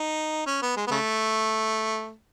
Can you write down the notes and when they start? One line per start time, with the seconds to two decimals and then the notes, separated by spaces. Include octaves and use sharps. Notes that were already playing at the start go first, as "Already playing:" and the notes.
Already playing: D#4
0.46 C#4
0.62 B3
0.76 G#3
0.87 B3
0.91 C#3 A3